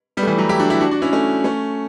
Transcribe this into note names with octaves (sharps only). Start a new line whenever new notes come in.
G3 B3
A3
E3 G3
F#3 A3
E4 G4
D4 F#4
E4 G4
D4 F#4
D4 F#4
C#4 E4
A3 C#4
A3 C#4